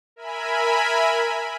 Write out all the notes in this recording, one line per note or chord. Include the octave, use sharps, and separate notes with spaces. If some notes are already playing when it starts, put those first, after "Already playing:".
A#4 E5 G#5 B5